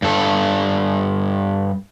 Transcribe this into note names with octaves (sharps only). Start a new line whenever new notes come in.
G2 A4